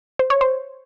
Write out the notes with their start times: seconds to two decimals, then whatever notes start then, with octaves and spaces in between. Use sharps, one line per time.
0.19 C5
0.30 C#5
0.41 C5